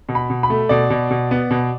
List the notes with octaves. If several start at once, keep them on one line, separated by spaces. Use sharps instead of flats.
B2
B5
B2
B5
A3
B2 D5
B2
B2
B3
B2